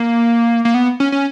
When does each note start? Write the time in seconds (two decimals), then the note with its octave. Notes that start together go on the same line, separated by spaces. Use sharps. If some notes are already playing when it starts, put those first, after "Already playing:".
Already playing: A#3
0.65 A#3
0.74 B3
1.00 C#4
1.12 C#4